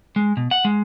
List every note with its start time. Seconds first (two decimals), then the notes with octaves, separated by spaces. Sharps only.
0.16 G#3
0.37 B2
0.51 F#5
0.65 G#3